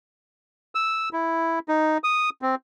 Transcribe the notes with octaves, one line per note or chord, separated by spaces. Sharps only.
E6
E4
D#4
D#6
C4